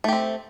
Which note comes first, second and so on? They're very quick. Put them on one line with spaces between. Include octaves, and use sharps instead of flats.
A3 G4 C4